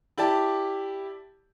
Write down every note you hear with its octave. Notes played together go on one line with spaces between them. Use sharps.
E4 G4 D5 A5